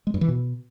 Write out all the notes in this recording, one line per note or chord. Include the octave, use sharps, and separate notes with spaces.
G#3
G2
E3
B2